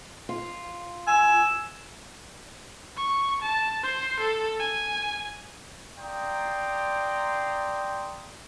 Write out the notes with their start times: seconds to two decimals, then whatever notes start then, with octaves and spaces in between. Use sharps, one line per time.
0.29 F4
1.07 G#5 E6
2.97 C#6
3.42 A5
3.83 C5 C6
4.20 A4
4.60 G#5
5.98 D5 F5 G5 A#5 C6 D#6